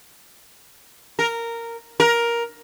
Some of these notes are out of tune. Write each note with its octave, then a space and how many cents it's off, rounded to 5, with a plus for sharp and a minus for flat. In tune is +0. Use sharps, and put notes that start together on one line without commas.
A#4 -10
A#4 +10